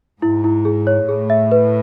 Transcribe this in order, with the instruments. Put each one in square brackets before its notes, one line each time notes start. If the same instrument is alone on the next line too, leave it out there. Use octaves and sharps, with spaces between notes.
[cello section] G#2 [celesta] E4
[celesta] E4
G#4
C#5
[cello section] A2 [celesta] G#4
[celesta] E5
B4